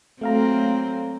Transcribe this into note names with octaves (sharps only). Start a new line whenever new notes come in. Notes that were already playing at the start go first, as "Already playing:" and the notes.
F#3 A3 A#3 C4 F5 A#5